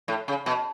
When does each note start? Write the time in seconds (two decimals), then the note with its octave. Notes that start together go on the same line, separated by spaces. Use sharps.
0.08 A2
0.28 C#3
0.46 B2